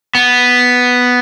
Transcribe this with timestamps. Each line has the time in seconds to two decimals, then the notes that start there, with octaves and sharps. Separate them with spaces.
0.15 B3